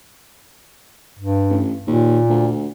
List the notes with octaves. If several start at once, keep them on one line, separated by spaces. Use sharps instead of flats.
G2
A1
D#2 A#2
D2